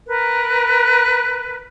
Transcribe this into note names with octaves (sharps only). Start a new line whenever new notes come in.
A#4 B4